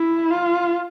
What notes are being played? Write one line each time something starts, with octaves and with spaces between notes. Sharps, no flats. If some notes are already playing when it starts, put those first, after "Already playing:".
Already playing: E4
F4